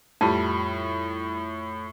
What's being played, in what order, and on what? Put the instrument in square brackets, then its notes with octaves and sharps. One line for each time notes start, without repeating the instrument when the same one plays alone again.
[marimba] F2 [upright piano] A2 [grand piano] G3